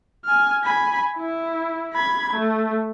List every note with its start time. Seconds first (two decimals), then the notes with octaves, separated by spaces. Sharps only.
0.25 G#5 F6
0.63 G#5 B5
1.16 E4
1.93 B5 G#6
2.34 A3